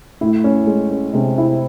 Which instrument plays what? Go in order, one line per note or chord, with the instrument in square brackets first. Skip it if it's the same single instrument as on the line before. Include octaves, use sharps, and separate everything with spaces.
[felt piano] A2 [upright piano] E4
[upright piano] C#4
G#3
C#4
[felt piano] C3 [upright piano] G#3
[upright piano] E4